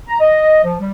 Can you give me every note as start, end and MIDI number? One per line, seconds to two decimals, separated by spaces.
0.07 0.18 82
0.20 0.60 75
0.64 0.74 53
0.80 0.91 55